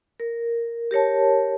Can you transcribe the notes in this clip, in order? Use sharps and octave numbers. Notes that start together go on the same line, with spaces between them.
A#4
G4 A#4 C#5 A5